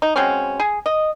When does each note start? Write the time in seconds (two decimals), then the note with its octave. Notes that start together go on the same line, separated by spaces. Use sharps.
0.02 D#4
0.16 F#3 G#3 C4 C#4
0.60 G#4
0.86 D#5